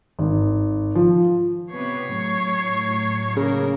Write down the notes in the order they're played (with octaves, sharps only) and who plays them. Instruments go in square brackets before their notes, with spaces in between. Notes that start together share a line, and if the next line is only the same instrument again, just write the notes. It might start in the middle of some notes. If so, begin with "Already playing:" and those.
[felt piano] G#1
F3
[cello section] C3 B3 [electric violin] C#5 C7
[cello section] A2 F#3
[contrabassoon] C#3 [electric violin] A#3 A#4